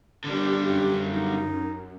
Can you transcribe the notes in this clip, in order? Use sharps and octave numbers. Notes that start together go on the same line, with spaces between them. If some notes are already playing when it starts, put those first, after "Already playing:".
D3 D#3 G3 D4 G4
F#2 G4
D#4